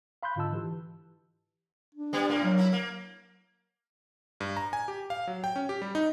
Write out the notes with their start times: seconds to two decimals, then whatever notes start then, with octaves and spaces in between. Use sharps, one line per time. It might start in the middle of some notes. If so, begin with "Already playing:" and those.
0.23 F5 B5 C6 F#6 G6
0.36 G#2 D3 F4 D#5 A5 E6
0.53 E3 G4
1.95 D4
2.13 G3 B3
2.29 A2 A#3
2.44 F#3
2.58 A#3 E4
2.73 A#3
4.40 G2
4.57 A#5
4.73 G#5
4.88 G4
5.10 F5
5.27 F#3
5.44 G5
5.56 C#4
5.69 G4
5.82 G3
5.95 D#4